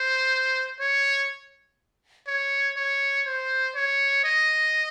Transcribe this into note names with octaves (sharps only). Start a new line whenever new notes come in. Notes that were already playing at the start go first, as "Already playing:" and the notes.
Already playing: C5
C#5
C#5
C#5
C5
C#5
D#5